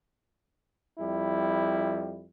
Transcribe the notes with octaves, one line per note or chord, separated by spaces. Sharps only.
F2 G3 E4